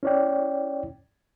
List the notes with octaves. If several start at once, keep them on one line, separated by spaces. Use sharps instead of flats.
C#4 E4 C#5 D5 G5